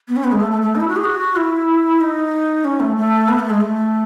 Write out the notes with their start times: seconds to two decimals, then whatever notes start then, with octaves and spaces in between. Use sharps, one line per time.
0.08 B3
0.16 C#4
0.24 B3
0.32 G#3
0.40 A3
0.51 A3
0.62 A3
0.75 D#4
0.80 E4
0.88 F#4
0.96 G#4
1.04 F#4
1.36 E4
2.01 D#4
2.65 C#4
2.80 A3
2.96 A3
3.29 B3
3.39 A3
3.50 G#3
3.61 A3